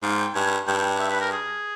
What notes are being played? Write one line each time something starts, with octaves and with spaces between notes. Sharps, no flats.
G#2 F5
G5
G2 G#5
G2 G5
E5
B4
A#4
G#4